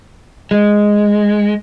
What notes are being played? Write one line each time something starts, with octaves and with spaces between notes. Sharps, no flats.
G#3